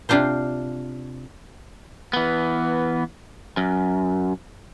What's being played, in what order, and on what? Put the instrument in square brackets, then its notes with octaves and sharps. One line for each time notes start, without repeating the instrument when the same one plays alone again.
[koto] C3 D4 F4 C5
[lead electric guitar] E3 B3
F#2